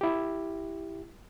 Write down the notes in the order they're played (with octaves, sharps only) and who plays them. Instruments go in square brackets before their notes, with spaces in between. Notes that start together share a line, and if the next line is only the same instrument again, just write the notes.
[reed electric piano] E4 G4